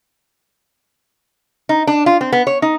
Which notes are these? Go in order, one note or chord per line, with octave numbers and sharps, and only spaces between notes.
D#4
D4
F4
C4
B3
C#5
D#4